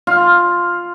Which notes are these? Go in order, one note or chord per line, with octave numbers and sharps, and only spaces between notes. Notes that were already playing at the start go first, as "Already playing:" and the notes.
F4